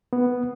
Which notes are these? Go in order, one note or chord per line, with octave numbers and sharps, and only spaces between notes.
B3